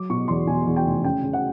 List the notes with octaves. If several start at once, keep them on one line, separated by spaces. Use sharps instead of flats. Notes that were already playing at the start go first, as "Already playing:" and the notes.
Already playing: F#3 D6
B2 C#6
E2 C6
B2 G#5
E2
G5
F1
C#3 G5
C#3
F#5